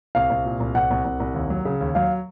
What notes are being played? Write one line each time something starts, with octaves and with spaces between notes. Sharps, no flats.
C2 F5
C2
A#2
C2
C2 F#5
C2
C2
C2
D#2
F#3
C#3
D#2
F#3 F5